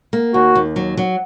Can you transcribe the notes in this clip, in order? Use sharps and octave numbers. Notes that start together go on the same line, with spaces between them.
A#3
D#2 F#4
D#2
F#3
F#3